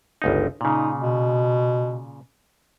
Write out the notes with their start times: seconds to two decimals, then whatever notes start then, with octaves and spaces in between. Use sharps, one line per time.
0.22 G1 C#2 D#4
0.61 A#2 C#3 D#4
0.98 B2